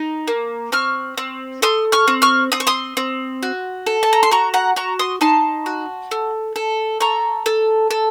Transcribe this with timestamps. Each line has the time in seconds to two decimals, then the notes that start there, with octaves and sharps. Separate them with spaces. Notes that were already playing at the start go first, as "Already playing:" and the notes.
Already playing: D#4
0.28 A#3
0.72 C4 C#6 F6
1.18 C4
1.62 A4 C6 D#6
1.92 C#6 F6
2.08 C4
2.22 C#6 F6
2.52 C4 D#6
2.60 C#6
2.67 C6 D#6
2.97 C4
3.43 F#4
3.87 A4
4.03 A5
4.13 A#5
4.23 C6
4.31 F#4 A#5 C#6
4.54 F#5 A#5
4.76 F#4 A#5 C#6
4.99 C6 D#6
5.21 D#4 A5 C6
5.66 F#4
6.11 A4
6.56 A4
7.00 A4 A#5 C#6
7.46 A4
7.91 A4